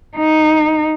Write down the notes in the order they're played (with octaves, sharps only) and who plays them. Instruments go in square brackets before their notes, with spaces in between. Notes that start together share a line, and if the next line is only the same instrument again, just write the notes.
[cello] D#4